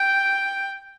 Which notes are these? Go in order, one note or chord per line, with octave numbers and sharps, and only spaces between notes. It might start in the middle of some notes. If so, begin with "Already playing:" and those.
Already playing: G5